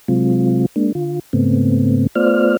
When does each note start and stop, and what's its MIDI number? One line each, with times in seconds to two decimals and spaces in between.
0.08 0.66 48
0.08 0.66 54
0.08 0.66 56
0.08 0.66 60
0.08 0.66 65
0.76 0.92 56
0.76 0.92 58
0.76 0.92 62
0.95 1.19 50
0.95 1.19 65
1.33 2.07 44
1.33 2.07 49
1.33 2.07 57
1.33 2.07 59
1.33 2.07 60
2.15 2.57 57
2.15 2.57 59
2.15 2.57 65
2.15 2.57 72
2.15 2.57 74
2.15 2.57 89